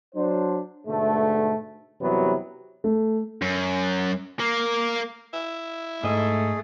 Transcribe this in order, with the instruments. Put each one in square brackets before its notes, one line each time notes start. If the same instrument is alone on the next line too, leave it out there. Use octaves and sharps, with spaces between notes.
[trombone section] F#3 D4 C5
G#2 B2 D3 A3
F#2 C3 E3 F#3 G3 B3
[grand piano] A3
[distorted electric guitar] F#2
A#3
[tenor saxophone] E4
[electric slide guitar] G#2 D#5 [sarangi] A3 [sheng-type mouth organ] G#4